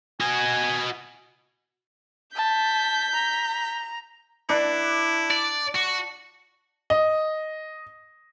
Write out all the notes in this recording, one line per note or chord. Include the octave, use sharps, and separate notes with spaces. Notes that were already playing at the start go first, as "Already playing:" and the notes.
F#4 D#5 G#5
A5 G6 B6
A#5
D4 E4
D5
F#4
D#5